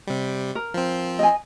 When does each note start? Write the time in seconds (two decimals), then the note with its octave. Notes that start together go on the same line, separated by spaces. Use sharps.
0.07 C3 G3
0.55 A#4
0.74 F3 C4
1.19 D#5 G#5